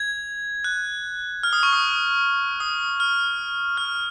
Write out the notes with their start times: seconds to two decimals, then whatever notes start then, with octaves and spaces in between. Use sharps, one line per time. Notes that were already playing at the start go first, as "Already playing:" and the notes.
Already playing: G#6
0.64 F#6
1.43 F6
1.53 D#6
1.63 C#6
1.73 D#6
2.60 D#6
3.00 F6
3.77 F6